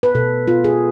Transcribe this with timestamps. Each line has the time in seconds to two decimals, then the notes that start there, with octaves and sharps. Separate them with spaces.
0.03 B4
0.15 B2 A4
0.48 B3 F4
0.64 G#4